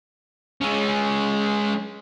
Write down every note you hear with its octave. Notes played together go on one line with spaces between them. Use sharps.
G#3 C#4